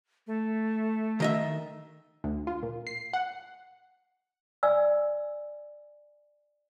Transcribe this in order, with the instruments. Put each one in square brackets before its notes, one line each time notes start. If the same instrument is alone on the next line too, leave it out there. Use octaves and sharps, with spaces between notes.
[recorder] A3
[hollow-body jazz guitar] D#3 D#5 E5
[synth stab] D2
F4
A#2
C7
F#5
[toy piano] D5 G#5 E6